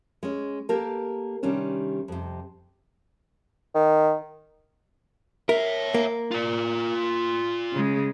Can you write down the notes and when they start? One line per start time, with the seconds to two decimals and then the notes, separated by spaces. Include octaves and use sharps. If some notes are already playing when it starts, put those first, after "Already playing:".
0.23 G#3 C#4
0.69 A#3 G4 A4 A#4
1.43 C3 D#3 G3 C#4 D4
2.08 F2 C3
3.75 D#3
5.49 A#4 C#5 E5
5.94 A#3
6.32 F4 D5
7.73 C#3 G#3